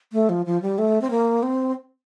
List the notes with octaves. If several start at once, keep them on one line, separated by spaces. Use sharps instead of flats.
A3
F3
F3
G3
A3
C4
A#3
C4